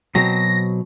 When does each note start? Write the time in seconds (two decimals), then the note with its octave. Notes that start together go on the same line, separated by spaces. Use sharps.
0.15 B2 F#3 C4 A#6